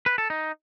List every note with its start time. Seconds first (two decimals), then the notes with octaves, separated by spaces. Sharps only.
0.06 B4
0.18 A4
0.30 D#4